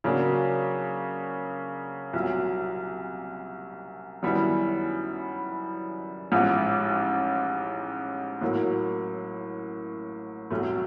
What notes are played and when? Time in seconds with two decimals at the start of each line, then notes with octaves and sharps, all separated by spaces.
0.04 C#3 F#3 A#3 D4
2.13 C2 A#2 F#3
4.23 F#2 D#3 G3 B3 E4
6.32 A1 G#2 F3
8.41 A2 F#3 A#3
10.50 C2 B2 F#3 A3